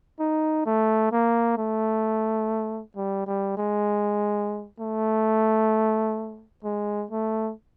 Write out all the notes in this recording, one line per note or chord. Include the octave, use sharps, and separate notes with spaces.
D#4
A3
A#3
A3
G3
G3
G#3
A3
G#3
A3